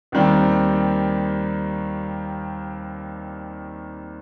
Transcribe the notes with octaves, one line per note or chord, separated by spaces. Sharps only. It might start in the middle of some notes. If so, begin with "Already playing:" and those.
D#2 D#3 G3 C4